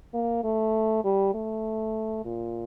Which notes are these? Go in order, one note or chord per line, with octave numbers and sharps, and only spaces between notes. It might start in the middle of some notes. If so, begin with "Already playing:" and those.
A#3
A3
G3
A3
A#2